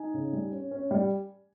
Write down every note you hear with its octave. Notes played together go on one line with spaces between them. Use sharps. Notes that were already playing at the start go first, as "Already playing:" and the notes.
Already playing: D#4 G#5
C#3
G3
C#4
C#4
G3